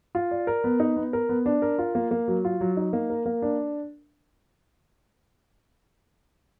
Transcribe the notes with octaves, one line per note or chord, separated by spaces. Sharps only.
F4
D5
A#4
B3
D#4
B3
A#4
B3
D4
A#4
F4
A#3
A#3
F#3
F4
F#3
D#4
A#3
A#4
A#3
D4